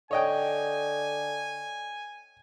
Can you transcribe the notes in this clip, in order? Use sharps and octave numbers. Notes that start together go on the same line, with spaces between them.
D3 C#5 D#5 G5 G#5